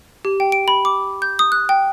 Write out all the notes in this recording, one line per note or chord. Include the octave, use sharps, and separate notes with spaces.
G4
G5
D7
B5
D6
G6
D#6
F#6
G5